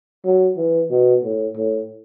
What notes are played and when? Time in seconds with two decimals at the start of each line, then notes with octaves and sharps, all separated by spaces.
0.25 F#3
0.57 E3
0.91 B2
1.24 A2
1.57 A2